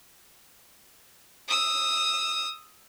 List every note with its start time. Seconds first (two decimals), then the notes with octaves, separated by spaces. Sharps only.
1.48 D#6 E6